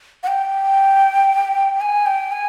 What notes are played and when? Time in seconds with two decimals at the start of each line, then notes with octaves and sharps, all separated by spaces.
0.23 F#5
0.27 G5
1.81 G#5
2.06 G5
2.32 G#5